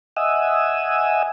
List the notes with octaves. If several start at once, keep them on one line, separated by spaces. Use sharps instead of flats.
D#5 E5 F#5 G#5 D#6 E6